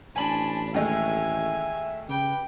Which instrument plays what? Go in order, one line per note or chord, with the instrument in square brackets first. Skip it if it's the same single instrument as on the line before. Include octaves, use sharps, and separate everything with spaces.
[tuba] A1 [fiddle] D4 B5 [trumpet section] C5 A5 [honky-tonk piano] G#5 F#7
[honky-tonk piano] D#2 G#3 A3 [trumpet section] E5 [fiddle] G#5
[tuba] C#3 [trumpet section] G4 B4 [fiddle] G5